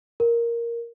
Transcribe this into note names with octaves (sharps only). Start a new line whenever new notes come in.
A#4